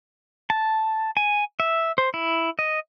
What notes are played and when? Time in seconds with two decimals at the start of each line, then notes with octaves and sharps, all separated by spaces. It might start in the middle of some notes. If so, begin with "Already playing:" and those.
0.50 A5
1.17 G#5
1.60 E5
1.98 C5
2.14 E4
2.59 D#5